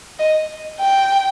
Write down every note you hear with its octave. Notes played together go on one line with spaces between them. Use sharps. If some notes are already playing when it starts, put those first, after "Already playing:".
D#5
G5